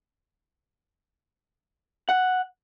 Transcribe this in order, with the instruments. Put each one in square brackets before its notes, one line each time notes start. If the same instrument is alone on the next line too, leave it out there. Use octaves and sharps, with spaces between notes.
[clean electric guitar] F#5